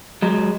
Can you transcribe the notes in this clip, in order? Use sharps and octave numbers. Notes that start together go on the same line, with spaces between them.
F#3 G#3